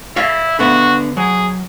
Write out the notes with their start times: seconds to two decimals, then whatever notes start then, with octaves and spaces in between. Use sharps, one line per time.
0.16 E4 C#5 D5 F5
0.59 D3 B3 F#4 E5
1.17 F#3 G#4